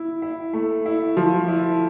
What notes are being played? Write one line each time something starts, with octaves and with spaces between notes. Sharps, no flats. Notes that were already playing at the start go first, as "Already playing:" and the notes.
Already playing: E4
E4
A3
E4
F3
E4